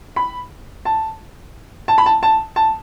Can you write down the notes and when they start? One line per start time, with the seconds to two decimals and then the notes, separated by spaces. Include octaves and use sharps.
0.16 B5
0.85 A5
1.88 A5
1.98 B5
2.06 A5
2.23 A5
2.56 A5